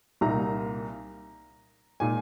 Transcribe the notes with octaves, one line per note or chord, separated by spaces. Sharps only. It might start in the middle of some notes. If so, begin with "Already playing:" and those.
C2 A#2 A#3 D#4 A#5
A#2 G#3 D#4 G#5